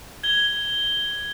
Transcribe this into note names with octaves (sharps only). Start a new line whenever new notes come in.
G#6 G7